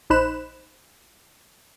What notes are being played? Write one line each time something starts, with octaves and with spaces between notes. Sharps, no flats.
A#1 D#4 C5 B5 F#6 E7